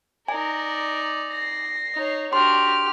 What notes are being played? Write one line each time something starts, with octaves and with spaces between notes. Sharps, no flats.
D#4 A#4 D5 G#5
A#6 C7
D#4 C#5
D4 F#4 G4 C6 F6